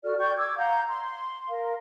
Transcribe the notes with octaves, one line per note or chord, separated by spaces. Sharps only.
F#4 A4 D5 F6
D5 G5 C#6 G6
D6 E6 G#6
F5 F#5 A#5 G6
C6
A#4 F5